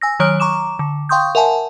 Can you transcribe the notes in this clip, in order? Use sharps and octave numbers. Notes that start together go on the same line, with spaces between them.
G#5 E6 A#6
D#3 F#3 C#5 F6 D7
A#5 C#6 D6 E7
D3
F5 G5 C6 C#6 D#6 G6
A#4 E5 F#5 G#5 A5